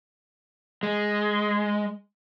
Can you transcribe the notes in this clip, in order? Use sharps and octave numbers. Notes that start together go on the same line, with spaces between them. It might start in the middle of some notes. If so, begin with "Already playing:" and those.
G#3